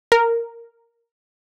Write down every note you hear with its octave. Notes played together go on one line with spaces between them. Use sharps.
A#4